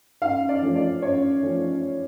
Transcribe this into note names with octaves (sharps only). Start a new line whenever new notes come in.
F#2 F5
D5
F3 A3 C#4
D5
F#2 C#5
F3 A3 C#4